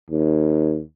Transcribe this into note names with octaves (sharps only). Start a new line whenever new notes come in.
D#2